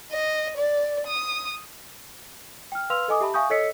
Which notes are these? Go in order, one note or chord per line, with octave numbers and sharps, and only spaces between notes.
D#5
D5
D#6
G5 F6
B4 F5 C6 E6 F6 F7
A4 D#5 G#5 D6 D#6
G4 E5 A5 B5
E5 F5 G#5 C#6 D#6 G6
A4 C#5 D#5 E6 B6 C#7